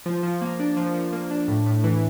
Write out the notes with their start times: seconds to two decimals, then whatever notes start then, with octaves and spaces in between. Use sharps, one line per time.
0.06 F3
0.23 F3
0.41 A#3
0.60 D4
0.77 F3
0.94 F3
1.13 A#3
1.31 D4
1.48 A2
1.66 A2
1.84 E3